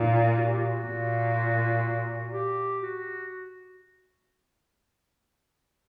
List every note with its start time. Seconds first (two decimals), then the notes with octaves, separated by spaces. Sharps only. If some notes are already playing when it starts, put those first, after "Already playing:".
Already playing: A#2 D#4
0.36 F#4
0.49 G4
0.63 F#4
0.85 A#2
2.32 G4
2.82 F#4